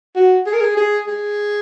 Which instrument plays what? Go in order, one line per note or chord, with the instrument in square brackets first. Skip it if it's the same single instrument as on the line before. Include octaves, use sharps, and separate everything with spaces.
[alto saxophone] F#4
G#4
A#4
G#4
G#4
G#4